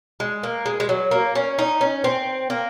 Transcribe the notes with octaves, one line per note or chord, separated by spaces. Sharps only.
G#3
A#3
G#3
G#3
F#3
A#3
C#4
D#4
C#4
C4
A#3